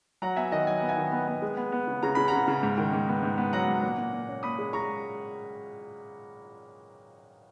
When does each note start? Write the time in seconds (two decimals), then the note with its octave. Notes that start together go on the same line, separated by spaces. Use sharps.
0.22 F#3 F#5 A#5
0.36 B3 E5 G#5
0.52 D#3 D#5 F#5
0.67 F#3 G#5
0.77 B3 F#5
0.89 E5 G#5
0.97 D#3
1.12 B3
1.27 B3
1.42 G#3
1.57 B3
1.72 B3
1.87 C#3
2.03 C#3 A#5
2.15 C#3 B5
2.28 C#3 F#5 A#5
2.48 C#3
2.63 G#2
2.78 D#3
2.93 G#2
3.08 B3
3.23 G#2
3.38 B3
3.53 F#3 F#5 A#5
3.68 G#2
3.83 A#2
3.98 A#2
4.13 A#2
4.29 C#4
4.43 A#2 B5 D#6
4.58 G#3
4.73 G#3 A#5 C#6